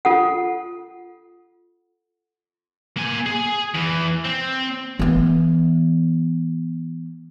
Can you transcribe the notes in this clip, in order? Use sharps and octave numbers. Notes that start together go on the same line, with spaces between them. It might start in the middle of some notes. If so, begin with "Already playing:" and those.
F4 A4 F#5
A#3 G#5
G#4
E2 E3
C4
E3 B3